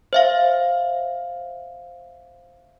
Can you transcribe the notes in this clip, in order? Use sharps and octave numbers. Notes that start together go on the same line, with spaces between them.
C5 E5 F5